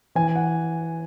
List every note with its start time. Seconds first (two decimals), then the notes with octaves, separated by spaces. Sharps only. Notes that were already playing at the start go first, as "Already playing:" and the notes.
0.15 E3 G#5
0.36 F#5